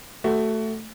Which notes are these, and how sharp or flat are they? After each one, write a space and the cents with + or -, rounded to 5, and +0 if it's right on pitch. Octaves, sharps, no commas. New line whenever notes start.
A3 +5 F#4 +25